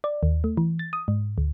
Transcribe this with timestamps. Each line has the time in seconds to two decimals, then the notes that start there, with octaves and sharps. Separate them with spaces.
0.04 D5
0.23 D#2
0.44 A3
0.57 E3
0.79 A6
0.93 D#6
1.08 G#2
1.38 D2